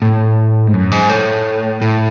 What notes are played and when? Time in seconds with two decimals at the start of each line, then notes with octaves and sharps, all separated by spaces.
0.02 A2
0.67 G#2
0.74 F#2
0.91 G#2
1.09 A2
1.82 A2